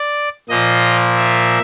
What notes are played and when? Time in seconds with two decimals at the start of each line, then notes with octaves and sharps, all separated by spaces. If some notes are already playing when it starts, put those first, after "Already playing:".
Already playing: D5
0.49 A#2 F3 A#3 D#5
1.17 E5